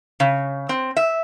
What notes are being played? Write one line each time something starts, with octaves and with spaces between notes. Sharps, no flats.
C#3
C4
E5